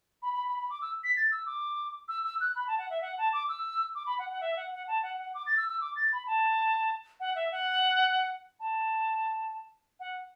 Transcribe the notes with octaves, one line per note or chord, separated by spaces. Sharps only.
B5
B5
B5
B5
D6
E6
B6
A6
E6
D6
E6
E6
F#6
B5
A5
F#5
E5
F#5
A5
D6
E6
D6
B5
F#5
F#5
E5
F#5
F#5
A5
F#5
F#5
D6
A6
E6
E6
D6
A6
B5
A5
F#5
E5
F#5
A5
F#5